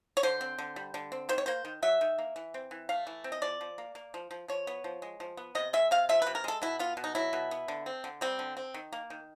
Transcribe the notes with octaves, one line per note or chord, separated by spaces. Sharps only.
C#5
D3 C5
C4
D3
G3
D3
C4
D#3 C5
C#5
A#3 C5
D#3
F#3 E5
D#3
A#3
E3
C4
E3
A3 F5
E3
C4
D#5
F3 D5
F3
A#3
A#3
F3
F3
F3 C#5
B3
F3
G#3
F3
B3
C3 D#5
G#3 E5
C3 F5
F3 E5
B4
C3
A#4
G#3 A4
B2 E4
B3 F4
B2
D#4
F#3 E4
B2
B3
D3
C4
D3
G3 C4
D3
C4
D#3
A#3
D#3